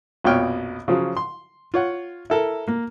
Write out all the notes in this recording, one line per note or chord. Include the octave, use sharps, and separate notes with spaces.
A#1 F2 B2 C#5 G5 F6
C#3 F3 F#3
C6
F4 C#5 F#5
E4 A4 A#4
A#3